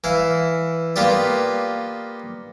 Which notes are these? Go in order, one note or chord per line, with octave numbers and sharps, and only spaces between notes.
E3 E4 F5
A#3 B3 F4 G4 D5